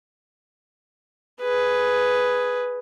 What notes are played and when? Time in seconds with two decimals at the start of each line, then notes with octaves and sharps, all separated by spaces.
1.42 G#4 B4